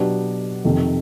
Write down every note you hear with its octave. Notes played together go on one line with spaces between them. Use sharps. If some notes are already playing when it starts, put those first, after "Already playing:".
Already playing: B2 F#3 B3 D4 G4
F2 C3 D#3